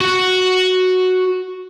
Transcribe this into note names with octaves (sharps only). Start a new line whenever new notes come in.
F#4 F#5